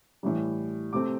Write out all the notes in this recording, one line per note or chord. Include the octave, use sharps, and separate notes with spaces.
A2 E3 G3
C3 A3 C4 D6